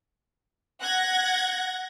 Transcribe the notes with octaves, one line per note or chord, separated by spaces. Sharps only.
F#5 F#6 G#6 A#6